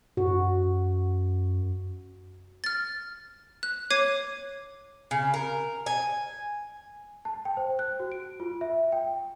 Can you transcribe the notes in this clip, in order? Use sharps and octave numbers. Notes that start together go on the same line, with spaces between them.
F#2 F#4
F6 A6
F#6
C#5 D6 G#6 C7 D#7
C#3
A#4
G#5
A5
G5
C5
F#6
F#4
D7
F4
E5
G5